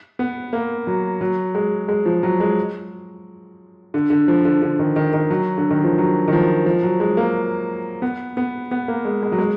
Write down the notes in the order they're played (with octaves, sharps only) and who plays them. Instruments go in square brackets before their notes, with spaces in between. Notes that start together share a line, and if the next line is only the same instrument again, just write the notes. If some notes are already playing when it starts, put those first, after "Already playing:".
[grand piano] B3
A#3
F#3
F#3
G#3
G#3
F3
F#3
G#3
D3
D3
F3
D3
D3
D#3
D#3
D#3
F#3
D3
D#3
F3
F#3
D#3
F3
F3
F#3
G#3
A#3
B3
B3
B3
A#3
G#3
G#3
F#3
G#3